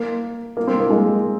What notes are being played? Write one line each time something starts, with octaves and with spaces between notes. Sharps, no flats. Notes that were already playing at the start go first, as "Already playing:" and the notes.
Already playing: A#3
A#3
C4
A#3
G#3